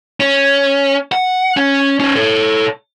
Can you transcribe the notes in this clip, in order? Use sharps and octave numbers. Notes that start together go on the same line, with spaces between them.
C#4
F#5
C#4
C#4 C5
A4 C#5